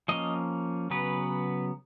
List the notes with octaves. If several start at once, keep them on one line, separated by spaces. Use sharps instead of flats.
F3 A#3 C#4 D#5
C#3 F#3 B3 B4